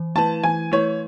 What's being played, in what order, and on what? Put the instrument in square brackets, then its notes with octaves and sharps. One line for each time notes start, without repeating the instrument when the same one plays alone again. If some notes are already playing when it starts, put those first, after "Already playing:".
Already playing: [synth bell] E3
[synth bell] A3 E4 B4 [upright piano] A5
[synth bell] E3 [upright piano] G#5
[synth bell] A3 E4 B4 [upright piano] C#5